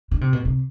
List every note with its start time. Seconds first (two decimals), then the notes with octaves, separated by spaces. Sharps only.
0.11 D3
0.21 C3
0.33 B2
0.45 C3